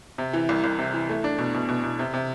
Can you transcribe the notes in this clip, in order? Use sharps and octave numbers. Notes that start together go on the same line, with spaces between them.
C3
E3
C2
C2
C3
E3
A3
D4
B2
B2
B2
B2
C3
C3